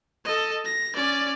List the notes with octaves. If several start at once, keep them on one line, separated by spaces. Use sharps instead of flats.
A4 D#5
A#6
C#4 D5